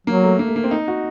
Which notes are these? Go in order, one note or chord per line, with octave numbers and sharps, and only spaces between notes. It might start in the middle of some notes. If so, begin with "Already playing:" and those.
F#3 A#3
A3
A#3
A3
A#3
C4
D#4
F#4